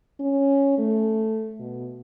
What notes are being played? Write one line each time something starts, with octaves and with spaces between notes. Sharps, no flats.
C#4
A3
B2